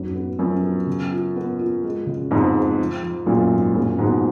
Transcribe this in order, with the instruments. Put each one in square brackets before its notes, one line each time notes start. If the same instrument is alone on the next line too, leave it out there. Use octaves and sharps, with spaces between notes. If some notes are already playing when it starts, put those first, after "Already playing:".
Already playing: [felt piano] F#2 B3 D#4
B3
[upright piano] F#2 [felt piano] F3
[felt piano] B3
C#3
F4
B3
F4
G#3
C#3
[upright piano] F2 G#2 [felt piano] B3
[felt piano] G#3
F3
F3
[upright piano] F#2 A#2 [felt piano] B3
[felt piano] G#2
[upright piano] F#2 A#2 [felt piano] F3
[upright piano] G#2 B2 [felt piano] B3